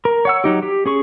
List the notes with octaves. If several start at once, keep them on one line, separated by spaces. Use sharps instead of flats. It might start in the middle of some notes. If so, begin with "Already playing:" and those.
A#4
C#5 F#5 E6
F#3 D#4 G4
G4
C#4 G#4 C#6